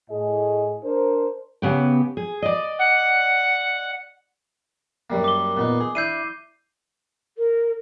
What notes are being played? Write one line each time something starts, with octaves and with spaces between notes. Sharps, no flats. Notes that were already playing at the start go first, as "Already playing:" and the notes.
A2 G#4 D#5
D4 A#4 C5
C#3 B3 G4
G#4
D5 D#5
F#5
F#2 G3 A#3
D6 G7
A#2 B3 D#4
G#4
D4 E4 G6 C7 D#7
A#4